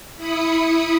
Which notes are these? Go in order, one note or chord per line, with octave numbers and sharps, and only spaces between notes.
E4 B5 D#6 C#7